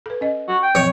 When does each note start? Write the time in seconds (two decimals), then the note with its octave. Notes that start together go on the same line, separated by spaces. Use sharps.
0.06 A4 B4
0.21 C#4 D#5
0.49 F#4
0.63 G5
0.75 F3 F#3 C4 C#5